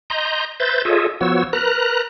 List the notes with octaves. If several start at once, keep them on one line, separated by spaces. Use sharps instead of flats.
D#5 A#5 C6 G6
B4 C5 E5 G6 A6
F4 G#4 A4 C#5 D#5 E5
F3 B3 F#4 C#5 E6
A#4 B4 A#5 F#6